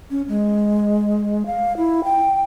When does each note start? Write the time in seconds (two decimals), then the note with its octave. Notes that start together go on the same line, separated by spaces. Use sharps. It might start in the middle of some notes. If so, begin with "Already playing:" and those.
0.11 C#4
0.28 G#3
1.46 F5
1.77 E4
2.04 G5